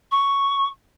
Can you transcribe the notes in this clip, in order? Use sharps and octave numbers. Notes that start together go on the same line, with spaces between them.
C#6